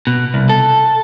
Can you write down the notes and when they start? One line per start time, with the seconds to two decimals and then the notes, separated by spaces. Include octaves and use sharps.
0.07 B2
0.34 C2
0.49 A4